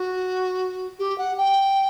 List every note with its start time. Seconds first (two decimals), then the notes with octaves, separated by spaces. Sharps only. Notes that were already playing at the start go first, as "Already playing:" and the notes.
Already playing: F#4
0.99 G4
1.18 F#5
1.37 G5